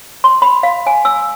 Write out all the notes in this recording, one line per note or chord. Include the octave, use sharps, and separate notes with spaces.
C6
B5
F5
G#5
E6